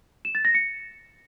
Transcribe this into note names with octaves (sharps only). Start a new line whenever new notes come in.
E7
A6
A#6
C#7